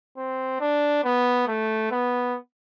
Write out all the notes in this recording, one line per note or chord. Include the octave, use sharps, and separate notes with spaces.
C4
D4
B3
A3
B3